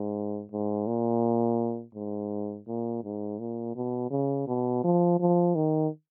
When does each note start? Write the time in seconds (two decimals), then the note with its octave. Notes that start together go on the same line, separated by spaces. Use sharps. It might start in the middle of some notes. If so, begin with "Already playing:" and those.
Already playing: G#2
0.52 G#2
0.87 A#2
1.95 G#2
2.67 A#2
3.04 G#2
3.39 A#2
3.76 B2
4.11 C#3
4.47 B2
4.84 F3
5.20 F3
5.55 D#3